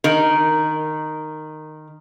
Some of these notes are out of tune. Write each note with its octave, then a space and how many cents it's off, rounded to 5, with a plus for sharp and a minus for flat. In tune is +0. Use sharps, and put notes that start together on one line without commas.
D#3 -10 A#4 +0